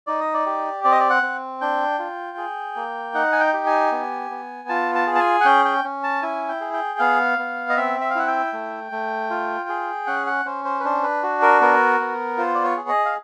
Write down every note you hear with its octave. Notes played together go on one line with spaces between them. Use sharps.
D#4 D5
D#5
D5
G4
C4 D5
D#5
D5
F#5
C4
D4 G5
F4
G#4
A#3
D#4 F#5
G#5
G5
G4
G#5
B3
B3
F4 A5
A5
G#4
A5
G#5
F#5
C#4 G5
G5
C#4
A5
E4 G#5
G5
G#4
G5
B3 F5
B3
D#5
C4 E5
E5
F5
E4 F#5
G5
A3
A3
F4
G#4
C#4 F#5
F#5
C#4 C5
C5
B4
D4 C5
B4
F#4
A#4
B3 A#4
B3
F4 C5
D5
C#5
G#4
D#5
F5